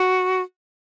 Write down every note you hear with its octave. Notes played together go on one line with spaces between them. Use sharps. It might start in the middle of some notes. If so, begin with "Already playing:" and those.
Already playing: F#4